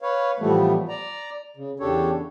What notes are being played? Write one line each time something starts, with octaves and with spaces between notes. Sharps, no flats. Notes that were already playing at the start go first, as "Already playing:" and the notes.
B4 C#5 F5
A2 E3 F3 G3 A3 B3
D5 A#5
C#3
E2 C#3 D4 G4 A4 C#5